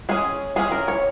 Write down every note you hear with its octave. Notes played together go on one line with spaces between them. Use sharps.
G#3 C#4 G#4
G#3 C#4 G#4
A#4
C#5